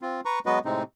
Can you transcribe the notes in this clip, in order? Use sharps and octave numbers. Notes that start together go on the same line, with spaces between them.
C4 F4
B4 A#5 C#6
F#3 G#3 B3 F#4 B4 D#5
A2 C3 G#3 C4 D#4